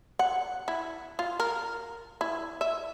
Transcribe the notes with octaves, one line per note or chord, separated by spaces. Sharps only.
F#5
E4
F4
A#4
E4
E5